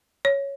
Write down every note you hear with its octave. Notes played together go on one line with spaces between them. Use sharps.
C#5